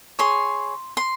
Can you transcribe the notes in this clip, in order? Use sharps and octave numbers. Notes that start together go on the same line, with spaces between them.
G#4 C#5 C6
C6